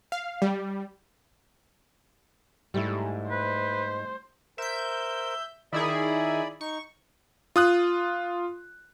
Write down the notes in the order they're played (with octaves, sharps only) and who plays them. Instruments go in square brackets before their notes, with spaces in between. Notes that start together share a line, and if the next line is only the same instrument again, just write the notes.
[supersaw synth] F5
G3
[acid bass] G#2 [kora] G3 A3 E4
[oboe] B4 [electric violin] C5
[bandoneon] A#4 C5 [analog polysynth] E5 G6
[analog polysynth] D#3 E4 G#4 [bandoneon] D5 B5
[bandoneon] D#4 [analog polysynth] C#6
[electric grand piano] F4 D#6 F#6